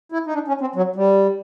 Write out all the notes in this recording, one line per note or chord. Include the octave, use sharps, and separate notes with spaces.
E4
D#4
D4
C#4
C4
F#3
G3